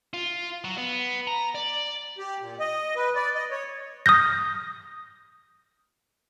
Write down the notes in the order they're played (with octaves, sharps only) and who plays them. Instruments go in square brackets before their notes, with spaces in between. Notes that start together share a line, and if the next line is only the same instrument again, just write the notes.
[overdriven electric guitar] F4
F#3
B3
A#5
D5
[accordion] G4
A#2
D#5
B4
D5
D#5
C#5
[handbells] D#6 F6 G6 A#6